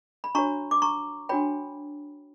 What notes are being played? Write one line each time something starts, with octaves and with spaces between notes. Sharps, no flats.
B5
D4 F#4 C#5 A#5 C#6
D6
A#5 C#6
D4 F#4 C#5 G5 B5